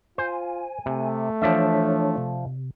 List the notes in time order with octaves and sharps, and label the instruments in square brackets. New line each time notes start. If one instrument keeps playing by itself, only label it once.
[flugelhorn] F4 [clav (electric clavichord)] C5 [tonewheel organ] G#5
[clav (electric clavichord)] C3 [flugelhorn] A3
[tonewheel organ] E3 D4 C#5 [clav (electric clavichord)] F3 D5 E5
[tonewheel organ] C3